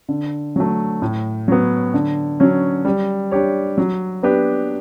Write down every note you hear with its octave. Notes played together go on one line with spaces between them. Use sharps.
D3
F#3 A3
A2
F#3 B3
D3
F#3 C#4
G3
D4 G4 C#5
F#3
B3 D4 G4 B4